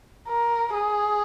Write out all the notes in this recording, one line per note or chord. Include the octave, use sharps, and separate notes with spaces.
A#4
G#4